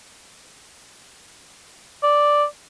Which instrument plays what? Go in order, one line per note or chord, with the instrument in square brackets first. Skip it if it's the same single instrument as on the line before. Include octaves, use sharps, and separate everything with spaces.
[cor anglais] D5